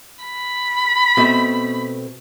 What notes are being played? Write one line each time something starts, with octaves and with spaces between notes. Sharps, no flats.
B5
B2 A3 C4